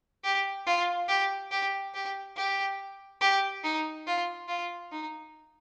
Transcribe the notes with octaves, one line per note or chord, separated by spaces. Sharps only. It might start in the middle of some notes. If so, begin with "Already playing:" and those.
G4
F4
G4
G4
G4
G4
G4
D#4
F4
F4
D#4